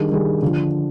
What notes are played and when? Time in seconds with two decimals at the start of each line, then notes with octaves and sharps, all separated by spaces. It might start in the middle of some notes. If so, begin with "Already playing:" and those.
Already playing: D#3 G3 D4 G#4
0.11 D#3 G3 D4 G#4
0.42 D3 F3